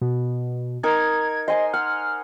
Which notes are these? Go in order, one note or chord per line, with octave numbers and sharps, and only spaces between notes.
B2
D#4 A#4 G#6
C5 D#5 G#5 C6
F#5 F6